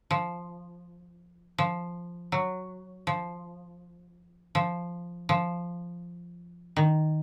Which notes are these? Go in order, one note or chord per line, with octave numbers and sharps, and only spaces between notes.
F3
F3
F#3
F3
F3
F3
D#3